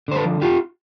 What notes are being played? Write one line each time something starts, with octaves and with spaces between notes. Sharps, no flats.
D3 C5
A4 B4
F3
F2 F4 G4